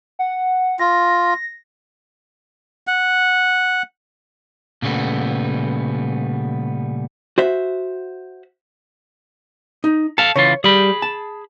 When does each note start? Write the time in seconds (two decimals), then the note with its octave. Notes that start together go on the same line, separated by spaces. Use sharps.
0.19 F#5
0.80 F4 A#6
2.87 F#5
4.82 A#2 C#3 G3 A3 B3
7.38 F#4 C5 E5
9.84 D#4
10.18 A4 F5 A5
10.36 C#3 E3 F4 C#5
10.64 G3 G#4 B5
11.02 A5